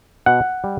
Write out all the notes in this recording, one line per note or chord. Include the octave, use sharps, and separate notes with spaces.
B2 F#5
G3